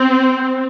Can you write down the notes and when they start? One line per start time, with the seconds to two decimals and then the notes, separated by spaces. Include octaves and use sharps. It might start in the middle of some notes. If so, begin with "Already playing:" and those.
Already playing: C4